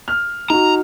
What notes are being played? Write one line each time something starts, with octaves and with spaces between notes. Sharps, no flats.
F6
D#4 F#4 A#5